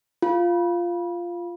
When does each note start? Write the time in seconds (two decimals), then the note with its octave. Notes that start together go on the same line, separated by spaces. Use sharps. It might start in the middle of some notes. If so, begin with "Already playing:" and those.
0.22 F4